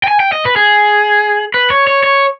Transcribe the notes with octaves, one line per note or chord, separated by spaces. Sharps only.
G5
G#5
G5
D#5
B4
G#4
B4
C#5
C#5
C#5